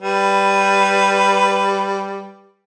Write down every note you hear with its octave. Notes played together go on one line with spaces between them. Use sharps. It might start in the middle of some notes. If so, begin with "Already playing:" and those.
G3 B4